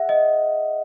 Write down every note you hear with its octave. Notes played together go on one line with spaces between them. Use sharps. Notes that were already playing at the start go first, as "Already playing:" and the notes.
Already playing: G#4 E5 F#5
D#5